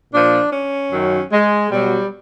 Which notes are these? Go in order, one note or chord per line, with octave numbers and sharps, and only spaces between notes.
A#2 F3 D4
C#4
F#2 D#3 F#3
G#3
B2 F#3 G3